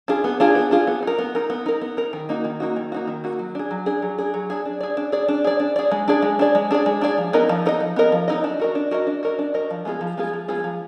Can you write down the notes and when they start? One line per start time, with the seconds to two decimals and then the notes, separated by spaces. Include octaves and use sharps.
0.08 D4 F4 G#4
0.24 B3
0.40 D4 F4 G#4
0.55 B3
0.71 D4 F4 G#4
0.87 B3
1.03 D#4 A#4
1.19 B3
1.35 D#4 A#4
1.50 B3
1.66 D#4 A#4
1.81 B3
1.97 D#4 A#4
2.13 D#3
2.29 A#3 D#4 F#4
2.45 D#3
2.60 A#3 D#4 F#4
2.76 D#3
2.92 A#3 D#4 F#4
3.07 D#3
3.24 A#3 D#4 F#4
3.39 F#3
3.55 D4 G#4
3.71 F#3
3.86 D4 G#4
4.02 F#3
4.18 D4 G#4
4.34 F#3
4.50 D4 G#4
4.65 D4
4.81 G#4 D5
4.97 D4
5.12 G#4 D5
5.28 D4
5.44 G#4 D5
5.60 D4
5.76 G#4 D5
5.91 G#3
6.08 D4 G#4 D5
6.22 G#3
6.39 D4 G#4 D5
6.55 G#3
6.71 D4 G#4 D5
6.86 G#3
7.01 D4 G#4 D5
7.18 F3
7.33 B3 D#4 A#4 D#5
7.49 F3
7.66 B3 D#4 A#4 D#5
7.80 F3
7.96 B3 D#4 A#4 D#5
8.12 F3
8.28 B3 D#4 A#4 D#5
8.44 D4
8.59 F#4 A#4 D#5
8.75 D4
8.91 F#4 A#4 D#5
9.07 D4
9.23 F#4 A#4 D#5
9.39 D4
9.54 F#4 A#4 D#5
9.70 F3
9.85 G#3 B3 F4 G#4
10.01 F3
10.17 G#3 B3 F4 G#4
10.33 F3
10.48 G#3 B3 F4 G#4
10.64 F3